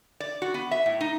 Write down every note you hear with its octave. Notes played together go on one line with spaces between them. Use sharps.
D5
F#4
B3
E5
A2
D#4